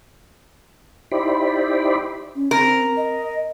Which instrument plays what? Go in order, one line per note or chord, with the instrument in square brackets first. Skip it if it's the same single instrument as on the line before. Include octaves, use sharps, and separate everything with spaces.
[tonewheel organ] D#4 E4 G4 C5 D5 B5
[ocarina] C#4
[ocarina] C4 [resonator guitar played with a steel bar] A#4
[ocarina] D#5